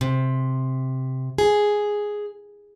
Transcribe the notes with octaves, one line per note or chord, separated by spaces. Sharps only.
C3
G#4